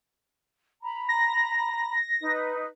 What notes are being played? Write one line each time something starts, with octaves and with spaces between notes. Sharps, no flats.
A#5 B5
A#6
D#4 B4